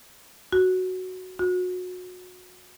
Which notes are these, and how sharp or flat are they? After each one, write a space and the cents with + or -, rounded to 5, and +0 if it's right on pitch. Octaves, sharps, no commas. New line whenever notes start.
F#4 +0
F#4 -30